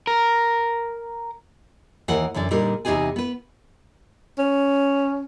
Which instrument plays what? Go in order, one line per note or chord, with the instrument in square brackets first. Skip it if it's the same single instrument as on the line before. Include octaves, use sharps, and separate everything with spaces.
[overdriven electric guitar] A#4
[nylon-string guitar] D#2 E3 A#4 F#5
F#2 D3 E3 D5
A#2 D3 G3 D#4 A#4
E2 C3 D#4 G4 G#4 G#5
B3 B4
[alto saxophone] C#4